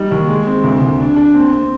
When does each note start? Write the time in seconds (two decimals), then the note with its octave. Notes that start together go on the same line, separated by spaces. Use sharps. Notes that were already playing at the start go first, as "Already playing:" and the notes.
Already playing: G3 D#4
0.11 D#2
0.28 G#3
0.47 C4
0.64 D2
0.81 D2
1.00 D4
1.16 D4
1.34 C4
1.53 C4